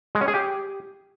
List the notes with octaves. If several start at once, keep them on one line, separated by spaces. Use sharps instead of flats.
G#3
C#4
G#4
G4